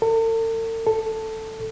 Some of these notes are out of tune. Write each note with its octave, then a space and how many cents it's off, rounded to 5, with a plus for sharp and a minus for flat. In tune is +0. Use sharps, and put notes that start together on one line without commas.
A4 +45
A4 +5